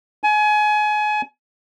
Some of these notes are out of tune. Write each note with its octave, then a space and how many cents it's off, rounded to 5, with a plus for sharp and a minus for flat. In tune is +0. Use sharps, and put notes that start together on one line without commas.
G#5 +30